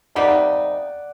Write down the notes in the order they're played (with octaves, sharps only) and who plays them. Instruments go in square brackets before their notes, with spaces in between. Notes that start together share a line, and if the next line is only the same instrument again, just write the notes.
[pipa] C3 G3 A#3 D#4 [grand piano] D5 F#5